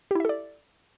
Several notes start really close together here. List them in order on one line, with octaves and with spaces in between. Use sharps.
G4 E4 E5 A4 D5